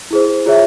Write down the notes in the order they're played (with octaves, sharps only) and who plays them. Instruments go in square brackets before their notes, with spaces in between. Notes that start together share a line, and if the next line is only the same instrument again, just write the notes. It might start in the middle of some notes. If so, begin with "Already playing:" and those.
[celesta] E4 G#4 C5
F4 G#4 C#5 E5